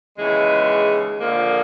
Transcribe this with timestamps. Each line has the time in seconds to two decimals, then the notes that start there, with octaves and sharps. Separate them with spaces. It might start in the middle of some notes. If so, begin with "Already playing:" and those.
0.17 D#2 C#3 E3 G#3
1.19 D3 F3 A#3